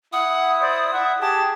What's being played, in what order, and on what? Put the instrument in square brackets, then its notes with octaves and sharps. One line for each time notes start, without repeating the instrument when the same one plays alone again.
[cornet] E4 [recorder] F#5 [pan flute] D#6
[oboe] C5 [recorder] D5
[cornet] E4 [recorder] E5 [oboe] F#5
[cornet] G4 [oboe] G#4 [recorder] A5